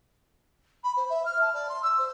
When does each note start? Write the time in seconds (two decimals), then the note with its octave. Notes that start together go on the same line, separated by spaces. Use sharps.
0.84 B5
0.97 C5
1.09 E5
1.25 F6
1.41 A5
1.54 D5
1.69 C6
1.83 E6
1.98 C5